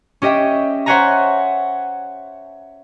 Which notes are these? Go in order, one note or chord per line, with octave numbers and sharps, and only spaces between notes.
C#4 G4 D#5 E5 G5
C5 C#5 E5 F#5 G#5 A#5